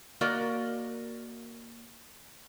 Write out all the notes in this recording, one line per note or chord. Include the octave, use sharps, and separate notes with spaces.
A#3 F#4 A#4 D5 D#5